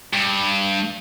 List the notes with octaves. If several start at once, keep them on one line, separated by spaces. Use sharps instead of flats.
G2